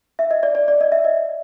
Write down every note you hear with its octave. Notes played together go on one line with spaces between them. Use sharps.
E5
D#5
D5
D5
D5
D#5
E5
D#5